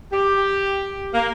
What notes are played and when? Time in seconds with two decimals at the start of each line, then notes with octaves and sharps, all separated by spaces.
0.13 G4
1.14 A#3